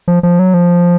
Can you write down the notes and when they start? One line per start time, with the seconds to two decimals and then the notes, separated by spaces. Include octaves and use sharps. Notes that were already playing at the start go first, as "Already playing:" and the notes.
0.08 F3
0.23 F3
0.39 F#3
0.54 F3